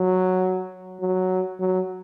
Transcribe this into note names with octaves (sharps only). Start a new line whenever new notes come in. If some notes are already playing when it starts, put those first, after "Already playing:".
Already playing: F#3
F#3
F#3